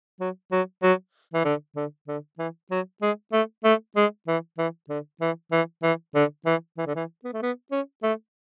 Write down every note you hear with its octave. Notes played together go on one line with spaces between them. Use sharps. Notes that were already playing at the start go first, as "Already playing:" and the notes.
F#3
F#3
F#3
E3
D3
D3
D3
E3
F#3
G#3
A3
A3
G#3
E3
E3
D3
E3
E3
E3
D3
E3
E3
D3
E3
B3
A3
B3
C#4
A3